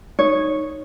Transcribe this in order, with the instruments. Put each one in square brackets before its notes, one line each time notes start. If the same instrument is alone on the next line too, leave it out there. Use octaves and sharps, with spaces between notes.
[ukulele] D#4 C#5